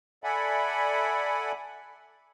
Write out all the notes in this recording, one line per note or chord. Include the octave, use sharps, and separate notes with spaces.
A4 D5 E5 F#5 G#5 B5